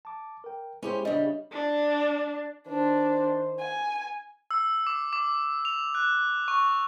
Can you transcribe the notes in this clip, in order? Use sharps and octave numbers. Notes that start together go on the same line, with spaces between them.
A5 D6
A#4 G5
G#3 C#4 E4 G4 G#4 C5
C#3 G3 D4 D#5 E5
D4
D#3 D4 C5
G#5
E6
D6
D6
F7
F#6
C#6